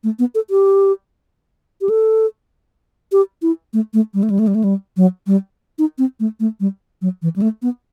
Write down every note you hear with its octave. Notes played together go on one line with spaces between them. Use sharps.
A3
B3
A4
G4
G4
A4
G4
E4
A3
A3
G3
A3
G3
A3
G3
A3
G3
F#3
G3
D#4
C4
A3
A3
G3
F#3
E3
G3
A3
B3